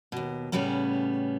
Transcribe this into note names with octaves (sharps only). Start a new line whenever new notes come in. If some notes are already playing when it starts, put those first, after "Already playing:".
D#2 B2
A2 C#3 G3 B3 C#4